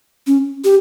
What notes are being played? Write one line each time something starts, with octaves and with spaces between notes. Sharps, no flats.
C#4
G4